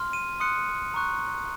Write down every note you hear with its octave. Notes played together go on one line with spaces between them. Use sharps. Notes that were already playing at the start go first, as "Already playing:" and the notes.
Already playing: C6 F6
D#7
C6 D#6 F#6 C#7
A#5 C#6 F#6